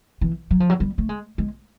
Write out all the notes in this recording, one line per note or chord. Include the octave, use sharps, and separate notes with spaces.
E3
F#3
F3
F#3
G3
A3
G#3
G#3